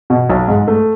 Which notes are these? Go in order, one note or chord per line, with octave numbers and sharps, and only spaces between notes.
B2
B1
G#2
A3